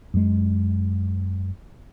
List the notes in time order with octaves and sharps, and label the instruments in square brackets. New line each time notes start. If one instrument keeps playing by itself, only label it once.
[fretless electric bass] F#2 G#3